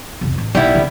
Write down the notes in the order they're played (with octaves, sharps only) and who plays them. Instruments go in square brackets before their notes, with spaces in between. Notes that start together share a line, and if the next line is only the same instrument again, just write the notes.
[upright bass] F1 B1
A1
[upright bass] B1 D#4 [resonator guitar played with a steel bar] G3 B3 E4
[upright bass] C#2 D3